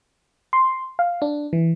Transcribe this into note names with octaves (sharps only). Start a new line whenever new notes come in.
C6
F5
D4
E3